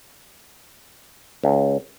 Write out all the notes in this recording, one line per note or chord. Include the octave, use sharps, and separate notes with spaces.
C#2